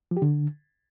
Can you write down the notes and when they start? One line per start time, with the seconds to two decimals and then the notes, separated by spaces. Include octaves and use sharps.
0.11 F3
0.17 G4
0.22 D3